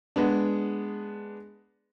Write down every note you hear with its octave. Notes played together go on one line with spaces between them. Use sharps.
G#3 B3 D4